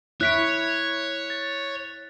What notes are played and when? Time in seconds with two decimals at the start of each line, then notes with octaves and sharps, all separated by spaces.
0.21 E4 C#5 F#6 B6 D7
1.30 A6